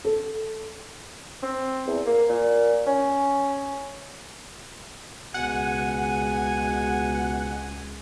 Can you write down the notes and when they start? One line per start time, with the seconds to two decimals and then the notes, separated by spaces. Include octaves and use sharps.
0.05 A4
1.43 C4
1.87 E2
2.06 A#3
2.29 A#2
2.87 C#4
5.34 C#2 B2 G#4 F#5 G#5